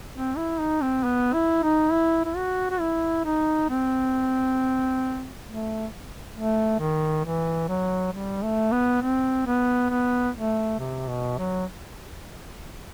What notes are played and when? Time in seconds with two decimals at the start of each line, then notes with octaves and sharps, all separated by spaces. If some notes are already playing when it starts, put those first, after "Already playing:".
0.15 C4
0.37 E4
0.59 D#4
0.81 C4
1.04 B3
1.34 E4
1.63 D#4
1.92 E4
2.25 E4
2.37 F#4
2.70 F#4
2.80 E4
3.25 D#4
3.69 C4
5.47 A3
6.35 A3
6.80 D#3
7.24 E3
7.69 F#3
8.13 G3
8.42 A3
8.72 B3
9.02 C4
9.46 B3
9.90 B3
10.34 A3
10.79 C3
11.08 B2
11.38 F#3